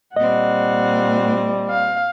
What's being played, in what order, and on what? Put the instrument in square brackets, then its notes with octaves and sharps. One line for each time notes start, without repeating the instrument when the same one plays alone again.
[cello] A#2 C4 [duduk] G3 [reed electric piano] D#5 [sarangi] F#5
[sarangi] F5